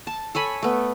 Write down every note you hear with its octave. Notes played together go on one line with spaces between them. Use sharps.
A5
A4 C#5 G#5 B5
A3 B3